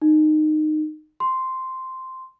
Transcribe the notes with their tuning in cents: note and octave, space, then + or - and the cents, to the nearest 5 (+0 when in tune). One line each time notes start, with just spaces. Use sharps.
D#4 -20
C6 -5